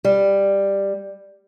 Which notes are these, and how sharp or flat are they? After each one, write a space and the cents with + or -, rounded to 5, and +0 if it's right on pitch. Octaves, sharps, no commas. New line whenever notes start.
G3 +10